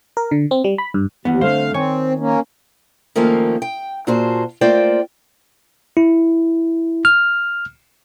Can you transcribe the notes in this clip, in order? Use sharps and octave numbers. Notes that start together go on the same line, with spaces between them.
A#4
D3
C4
G3
B5
G2
D#2 E3 B3 F#5
D3 A3 C4 C5 F5
D#3 C4 C#5 G#5
A#3 C#4
D#3 F3 A3 A#3 C#4
G5
A#2 F4 F#4 G#4 C5 A5
A3 A#3 F4 C5 D5 G5
E4
F6